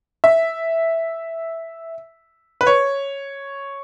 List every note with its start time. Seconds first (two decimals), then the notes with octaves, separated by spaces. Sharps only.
0.24 E5
2.61 B4
2.67 C#5